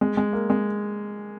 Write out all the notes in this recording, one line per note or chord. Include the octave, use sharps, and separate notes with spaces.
G#3
G#3
A#3
G#3